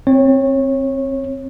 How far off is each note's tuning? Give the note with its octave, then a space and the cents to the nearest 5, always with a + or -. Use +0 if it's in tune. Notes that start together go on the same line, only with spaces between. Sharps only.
C4 +15 C#5 -20